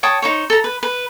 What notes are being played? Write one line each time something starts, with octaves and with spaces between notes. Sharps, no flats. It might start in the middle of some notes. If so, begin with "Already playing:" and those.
C#5 G5 A5 D#6
D#4 C5 C#5
A4 A#5
B4
B4